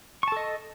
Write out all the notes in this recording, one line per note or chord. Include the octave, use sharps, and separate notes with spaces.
A4 D#5 A5 C#6